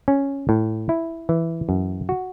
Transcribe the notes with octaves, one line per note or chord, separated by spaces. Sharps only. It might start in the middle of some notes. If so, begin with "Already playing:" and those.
C#4
A2
E4
E3
F#2
F#4